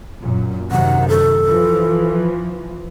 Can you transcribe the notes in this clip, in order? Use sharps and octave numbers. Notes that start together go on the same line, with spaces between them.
F#2 A#2
F#2 C3 D#3 F#5
A4
E3 F3